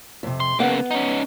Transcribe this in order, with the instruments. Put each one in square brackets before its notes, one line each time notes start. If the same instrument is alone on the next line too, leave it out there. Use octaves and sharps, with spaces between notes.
[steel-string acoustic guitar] F2 C3
[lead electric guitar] C6
[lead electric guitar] C#3 A#3 [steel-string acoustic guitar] B3 F#5
[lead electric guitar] C#4 D#4